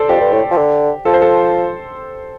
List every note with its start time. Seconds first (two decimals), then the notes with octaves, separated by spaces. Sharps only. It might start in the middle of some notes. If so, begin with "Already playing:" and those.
Already playing: A4 C5 D5
0.09 F2 G4
0.21 G2
0.33 A2
0.51 F3
0.57 D3
1.05 F3 A4
1.14 C5
1.22 A4